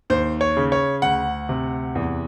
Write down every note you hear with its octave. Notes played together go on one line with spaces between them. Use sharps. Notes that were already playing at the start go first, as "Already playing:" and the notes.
D#2 C5
C#5
C#3
C#5
D2 F#5
C3
E2